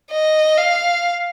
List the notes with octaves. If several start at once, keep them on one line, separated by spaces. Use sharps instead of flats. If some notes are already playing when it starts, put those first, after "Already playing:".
D#5
F5